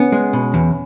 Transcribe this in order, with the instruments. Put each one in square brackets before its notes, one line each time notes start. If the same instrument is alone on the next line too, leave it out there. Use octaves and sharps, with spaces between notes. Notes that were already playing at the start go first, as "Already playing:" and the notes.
Already playing: [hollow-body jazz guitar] B3 [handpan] C#4
[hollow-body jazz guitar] G#3
B2
E2